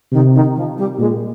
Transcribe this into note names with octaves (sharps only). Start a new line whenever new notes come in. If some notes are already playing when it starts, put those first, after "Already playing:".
C3 D#3
D#3
F3
G3
A#2 G#3